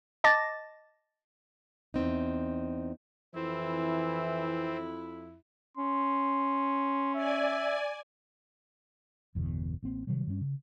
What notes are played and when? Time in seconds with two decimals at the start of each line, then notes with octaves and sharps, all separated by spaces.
0.24 D#5 A5 D6 A6 A#6
1.94 E2 G2 C4 D#4
3.35 F2 E3 C4 E4
5.77 C#4 C6
7.15 D5 E5 G#5
9.35 G1 E2 B2 D3
9.83 A1 A#3 C4
10.07 C3 D#3 F#3 G3
10.27 G2 G3 A3 C#4
10.41 C#3